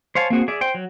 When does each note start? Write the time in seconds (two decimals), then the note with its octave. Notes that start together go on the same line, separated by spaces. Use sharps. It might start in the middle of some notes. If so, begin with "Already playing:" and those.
0.15 C5 C#5 F5 G#5 A5
0.30 A#3 C4 F#4 G#4
0.48 G#4 D5 E5
0.61 C5 G5
0.74 F#3